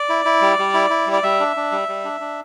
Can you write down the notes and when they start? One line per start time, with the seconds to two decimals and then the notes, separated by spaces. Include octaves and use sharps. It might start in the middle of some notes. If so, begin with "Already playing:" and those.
Already playing: D5
0.09 E4
0.25 E4
0.41 G3
0.59 G3
0.74 E4
0.90 E4
1.07 G3
1.13 D5
1.23 G3 E5
1.40 D4
1.56 D4
1.72 G3
1.88 G3
2.05 D4
2.21 D4